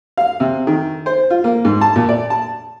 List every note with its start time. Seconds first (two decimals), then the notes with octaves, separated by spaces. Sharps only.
0.17 F5
0.40 C3
0.67 D#3
1.06 C5
1.30 F4
1.44 A#3
1.65 G#2
1.81 A5
1.96 A#2
2.09 D5
2.30 A5